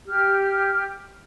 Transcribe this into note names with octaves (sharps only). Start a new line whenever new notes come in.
G4 F6